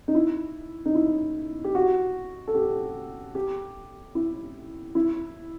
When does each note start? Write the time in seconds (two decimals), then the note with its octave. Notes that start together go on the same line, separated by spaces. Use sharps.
0.08 D#4
0.15 E4
0.86 D#4
0.95 E4
1.64 G4
1.75 F#4
2.48 A4
2.55 G4
3.35 G4
4.15 E4
4.95 E4